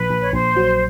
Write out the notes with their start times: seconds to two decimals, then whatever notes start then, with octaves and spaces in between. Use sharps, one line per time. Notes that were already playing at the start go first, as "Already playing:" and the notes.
Already playing: A#1 B4
0.10 A#1
0.22 C#5
0.33 A#1 C5
0.56 F#3